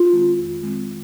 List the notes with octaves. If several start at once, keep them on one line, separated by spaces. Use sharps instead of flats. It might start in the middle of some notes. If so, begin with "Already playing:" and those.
Already playing: F4
D#3 G#3 C4
F2
D#3 G#3 C4